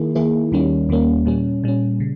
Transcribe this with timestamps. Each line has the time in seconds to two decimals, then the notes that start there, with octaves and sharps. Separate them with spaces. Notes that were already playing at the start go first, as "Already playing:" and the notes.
Already playing: D#3 A#3 E4 G#4
0.15 D#3 A#3 E4 G#4
0.52 D#2 D#3 G3 A#3 C#4
0.89 D#2 D#3 G3 A#3 C#4
1.26 A#2 G3 C#4
1.64 A#2 G3 C#4
2.00 C#3